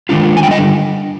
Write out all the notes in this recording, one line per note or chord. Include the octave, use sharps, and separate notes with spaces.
D#3 G#3 D4 F4
G#5
D3 G3 D4 G5
D#5